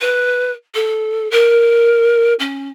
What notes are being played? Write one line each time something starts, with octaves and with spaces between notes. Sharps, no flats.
B4
A4
A#4
C#4